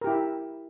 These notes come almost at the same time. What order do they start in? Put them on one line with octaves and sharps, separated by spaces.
A#4 G4 E4 E5